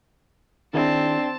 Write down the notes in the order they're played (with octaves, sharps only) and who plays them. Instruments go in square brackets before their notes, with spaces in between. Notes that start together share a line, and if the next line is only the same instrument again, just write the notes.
[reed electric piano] D#3 E4 G#4 [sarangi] C4 [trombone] D4 [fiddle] A5